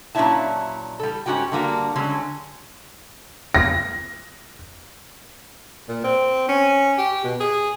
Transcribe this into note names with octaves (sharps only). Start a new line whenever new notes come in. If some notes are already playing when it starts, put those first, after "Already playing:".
A#2 F#3 C#4 D4 E4 A5
G3 A4
G#2 C#4 F#4 G4 G5
D3 G3 A#3 F#4
D3 F#3 G#3 C#4
A#6
A#2
C4
C#4
G4
B2
G#4